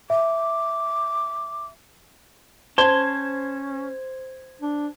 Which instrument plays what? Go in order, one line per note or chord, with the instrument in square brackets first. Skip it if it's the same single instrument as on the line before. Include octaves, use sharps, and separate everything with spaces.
[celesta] E5 [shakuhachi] D6
[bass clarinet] C#4 [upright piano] C5 [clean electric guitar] A5 C6 [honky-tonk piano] G#6
[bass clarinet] D4